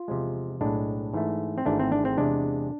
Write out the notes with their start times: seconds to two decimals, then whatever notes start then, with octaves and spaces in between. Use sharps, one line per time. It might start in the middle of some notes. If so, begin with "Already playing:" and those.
Already playing: F4
0.08 E2 C3 F3 G#3
0.61 B1 A2 G#3 D4
1.13 G#2 E3 A3
1.58 C4
1.65 G#1 G#2 E3 A3 D4
1.79 C4
1.92 D4
2.05 C4
2.18 E2 C3 G#3 D4